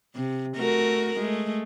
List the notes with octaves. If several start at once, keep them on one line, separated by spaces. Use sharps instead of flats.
C3
A3 F#4 A#4
G#3 A3